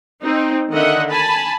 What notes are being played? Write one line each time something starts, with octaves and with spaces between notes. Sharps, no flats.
C4 D#4
D3 D#3 D#5 E5 F#5
G#5 A5 B5